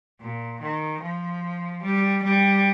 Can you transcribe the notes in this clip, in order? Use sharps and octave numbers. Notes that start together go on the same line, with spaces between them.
A#2
D#3
F3
G3
G3